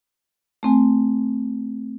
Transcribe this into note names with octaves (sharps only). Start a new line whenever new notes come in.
A3 C4 G#5